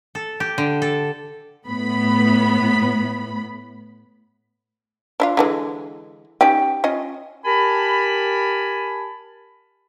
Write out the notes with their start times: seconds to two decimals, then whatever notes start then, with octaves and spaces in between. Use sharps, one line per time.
0.15 A4
0.40 G4
0.58 D3
0.82 A4
1.69 A2 B3 B5
5.20 D4 E4 F4
5.37 D3 E3 G#3
6.41 C#4 D#4 G4 G5
6.84 C#4 F4 D#5
7.45 G4 A#4 G#5 A5 B5